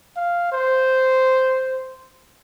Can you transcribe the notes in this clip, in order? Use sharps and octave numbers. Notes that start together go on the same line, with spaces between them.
F5
C5